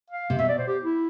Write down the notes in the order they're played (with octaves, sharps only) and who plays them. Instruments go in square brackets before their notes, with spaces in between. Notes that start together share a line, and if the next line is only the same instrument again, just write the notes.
[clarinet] F5
[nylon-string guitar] C3
[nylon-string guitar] B2 [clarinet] E5
[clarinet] D5
C5
G4
E4